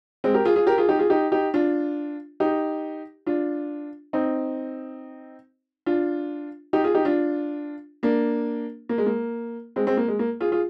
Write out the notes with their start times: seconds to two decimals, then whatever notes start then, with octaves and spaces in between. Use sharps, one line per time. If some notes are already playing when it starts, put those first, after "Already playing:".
0.24 G#3 C4
0.34 G4 A#4
0.45 F4 G#4
0.56 F4 G#4
0.67 G4 A#4
0.78 F4 G#4
0.89 D#4 G4
0.99 F4 G#4
1.10 D#4 G4
1.32 D#4 G4
1.54 D4 F4
2.40 D#4 G4
3.27 D4 F4
4.13 C4 D#4
5.86 D4 F4
6.73 D#4 G4
6.84 F4 G#4
6.95 D#4 G4
7.05 D4 F4
8.03 A#3 D4
8.89 A#3
8.98 G#3
9.06 A#3
9.76 G#3 C4
9.87 G#3 C4
9.97 A#3
10.08 G#3
10.19 A#3
10.41 F4 G#4
10.51 F4 G#4